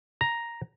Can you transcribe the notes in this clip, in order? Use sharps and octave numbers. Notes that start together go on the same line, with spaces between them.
A#5